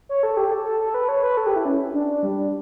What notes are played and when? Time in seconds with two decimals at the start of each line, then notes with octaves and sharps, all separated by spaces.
0.09 C#5
0.23 A4
0.37 G4
0.51 A4
0.66 A4
0.80 A4
0.94 B4
1.09 C#5
1.23 B4
1.37 A4
1.47 G4
1.56 E4
1.65 C#4
1.94 D4
2.23 G3